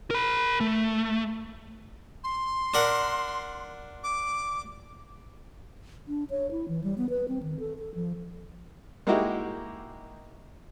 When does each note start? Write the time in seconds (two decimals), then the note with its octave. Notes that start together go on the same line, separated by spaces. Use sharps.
0.10 A#4 B5
0.60 A3
2.24 C6
2.74 D4 A#4 F#5
4.03 D6
6.08 D4
6.30 C#5
6.51 E4
6.68 E3
6.84 G3
6.98 B3
7.10 B4
7.28 C4
7.43 D#3
7.60 A4
7.79 A4
7.95 F3
9.07 G#3 A#3 D#4 E4 F#4 G4